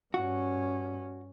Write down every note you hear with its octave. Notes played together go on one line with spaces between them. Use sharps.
G2 C#4 F#4